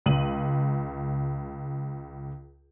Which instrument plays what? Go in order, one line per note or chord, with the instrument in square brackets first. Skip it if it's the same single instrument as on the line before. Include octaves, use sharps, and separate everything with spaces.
[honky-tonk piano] C#2 D#7 F#7